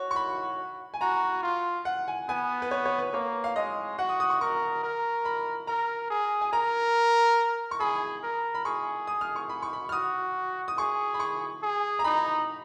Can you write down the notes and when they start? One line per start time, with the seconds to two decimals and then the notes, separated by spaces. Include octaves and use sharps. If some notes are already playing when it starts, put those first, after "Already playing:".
Already playing: F#4 C#5
0.11 C#6
0.16 B5
0.94 G#5
1.01 F#4 A#5
1.43 F4
1.85 F#5
2.08 G#5
2.29 B3 G#5
2.62 B4
2.71 C#5
2.86 C#5
2.98 B4
3.13 A#3 C#5
3.44 F5
3.56 G#3 D#5
3.98 F#4 F#5
4.09 D#6
4.20 D#6
4.30 C#6
4.41 A#4 C#6
4.83 A#4
5.25 B5
5.67 A#4 A#5
6.10 G#4
6.41 G#5
6.53 A#4 A#5
7.71 C#6
7.80 G#4 B5
8.23 A#4
8.55 B5
8.65 G#4 C#6
9.07 D#6
9.21 F6
9.36 C#6
9.49 B5
9.62 C#6
9.73 B5
9.89 F6
9.92 F#4 D#6
10.68 D#6
10.78 G#4 C#6
11.14 B5
11.20 C#6
11.62 G#4
11.99 A#5
12.04 D#4 B5